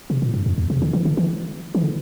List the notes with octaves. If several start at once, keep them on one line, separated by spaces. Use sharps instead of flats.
C3
A#2
G2
F2
E2
C3
D3
E3
D3
E3
E3
D3